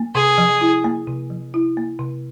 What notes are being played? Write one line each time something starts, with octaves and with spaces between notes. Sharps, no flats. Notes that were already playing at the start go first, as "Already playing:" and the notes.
Already playing: A#3
C3 G#4
F3
E4
A#3
C3
F3
E4
A#3
C3